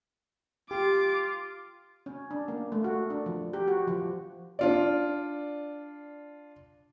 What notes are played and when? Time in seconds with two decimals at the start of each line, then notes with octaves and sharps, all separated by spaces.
0.71 F4 G4 D6
2.06 C#4
2.31 D4
2.48 A#3
2.72 A3
2.84 F#4
3.10 D4
3.26 F3
3.53 G4
3.68 F#4
3.88 F3
4.59 D4 F4 D5